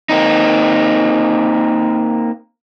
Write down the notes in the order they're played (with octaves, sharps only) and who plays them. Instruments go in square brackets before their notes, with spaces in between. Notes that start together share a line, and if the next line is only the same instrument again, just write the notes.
[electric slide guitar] A#3 C4 D#4